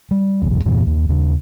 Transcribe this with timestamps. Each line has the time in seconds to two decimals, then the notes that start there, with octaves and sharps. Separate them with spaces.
0.11 G3
0.42 F1 B1 E2
0.65 E2 G2 A#2 E3
0.87 D#2
1.09 D#2 C#3